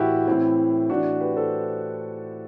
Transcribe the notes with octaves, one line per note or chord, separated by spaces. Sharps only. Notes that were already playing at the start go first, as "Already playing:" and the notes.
Already playing: A2 E3 E4 F#4 G4
A2 E3 C4 E4
A2 E3 D4 F#4
G4 B4
A4 C5